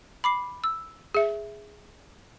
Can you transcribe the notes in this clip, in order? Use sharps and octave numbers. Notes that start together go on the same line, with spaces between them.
B5 D6 C7
E6
G#4 E5